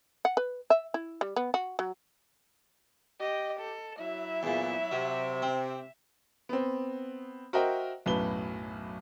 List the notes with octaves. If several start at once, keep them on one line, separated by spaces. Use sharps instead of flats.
F#5
B4
E5
E4
G3
B3
F#4
F#3
G4 D#5
A4
F#3 E4 E5
E2 A#2
C3 F#3
C4
B3 C4
F#4 A#4 C5 D#5 E5 G5
B1 F#2 A2 B4 G7